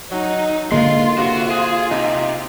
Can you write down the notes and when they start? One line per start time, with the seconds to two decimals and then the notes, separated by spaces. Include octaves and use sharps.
0.11 F#3 D#4
0.72 D3 G#3 A#3 F4 C6
1.18 C3 F#4
1.51 G#4
1.91 C3 D#4